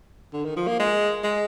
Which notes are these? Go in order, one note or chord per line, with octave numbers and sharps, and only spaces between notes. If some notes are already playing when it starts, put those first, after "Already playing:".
D3
D#3
F3
A#3
G#3
G#3